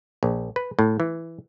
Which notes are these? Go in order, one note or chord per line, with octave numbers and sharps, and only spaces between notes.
A#1
B4
A2
E3